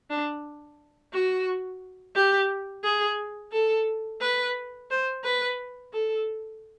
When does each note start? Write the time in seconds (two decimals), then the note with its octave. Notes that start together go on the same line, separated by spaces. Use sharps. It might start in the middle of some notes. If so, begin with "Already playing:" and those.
0.10 D4
1.13 F#4
2.15 G4
2.84 G#4
3.53 A4
4.21 B4
4.91 C5
5.24 B4
5.93 A4